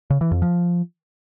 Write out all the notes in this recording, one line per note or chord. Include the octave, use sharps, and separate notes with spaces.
C#3
E3
F2
F3